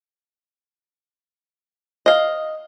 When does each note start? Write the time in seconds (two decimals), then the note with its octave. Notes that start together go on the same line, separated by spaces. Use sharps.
2.06 D#5 F5